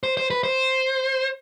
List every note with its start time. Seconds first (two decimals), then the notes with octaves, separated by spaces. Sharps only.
0.03 C5
0.17 C5
0.30 B4
0.43 C5